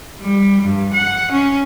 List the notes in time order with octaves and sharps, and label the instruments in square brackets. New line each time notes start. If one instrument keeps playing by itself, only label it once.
[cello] G3
G2
F#5
C#4